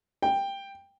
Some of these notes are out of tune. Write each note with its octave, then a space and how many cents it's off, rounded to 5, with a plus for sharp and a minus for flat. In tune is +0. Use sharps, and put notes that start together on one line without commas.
G5 +10